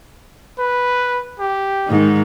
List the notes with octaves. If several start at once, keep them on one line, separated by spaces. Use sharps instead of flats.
B4
G4
G#2 D#3